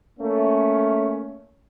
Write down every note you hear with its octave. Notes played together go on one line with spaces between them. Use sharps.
A3 A#3 C#4